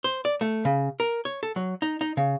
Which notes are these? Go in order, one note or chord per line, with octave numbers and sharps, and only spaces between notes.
C5
D5
A3
C#3
A#4
C#5
A4
F#3
D#4
D#4
C#3